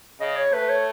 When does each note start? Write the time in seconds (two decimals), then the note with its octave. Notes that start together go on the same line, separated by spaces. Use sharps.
0.20 C#3 D#5
0.36 C#5
0.53 A3 B4
0.69 C#5